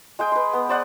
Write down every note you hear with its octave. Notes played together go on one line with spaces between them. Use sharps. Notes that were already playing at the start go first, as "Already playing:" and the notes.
G#3 G#4 G5
B4 C6
B3
C5 D5 F#5 D#6